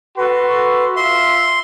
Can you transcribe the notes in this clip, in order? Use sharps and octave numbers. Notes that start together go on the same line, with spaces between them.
F#4 A4 B4 C6
F4 E5 C6